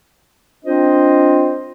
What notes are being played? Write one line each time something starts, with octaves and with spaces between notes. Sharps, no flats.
C4 D4 F4 C5 D#5